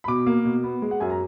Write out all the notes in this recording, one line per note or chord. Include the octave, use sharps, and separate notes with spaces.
B5
B2 D6
A#3
B2
B3
G#3
F#5
F#2 G#5
A#5